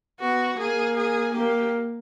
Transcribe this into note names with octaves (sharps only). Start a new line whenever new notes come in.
B3 F#4
A#3 G#4
G#4
A#3 G4